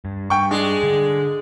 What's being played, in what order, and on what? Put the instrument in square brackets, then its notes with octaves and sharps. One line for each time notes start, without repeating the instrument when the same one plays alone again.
[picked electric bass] G2
[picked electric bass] G2 [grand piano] G5 C#6
[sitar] G#3 [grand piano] D4
[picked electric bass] D3